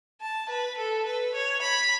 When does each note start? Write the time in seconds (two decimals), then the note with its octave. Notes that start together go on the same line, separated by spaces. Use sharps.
0.21 A5
0.50 B4
0.78 A4
1.06 B4
1.34 C#5
1.62 B5